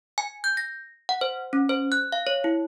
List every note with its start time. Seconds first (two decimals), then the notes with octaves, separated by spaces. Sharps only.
0.18 G#5
0.44 G6
0.57 A#6
1.09 F#5
1.21 C5
1.53 C#4
1.69 C5
1.92 F#6
2.12 F5
2.27 C#5
2.44 E4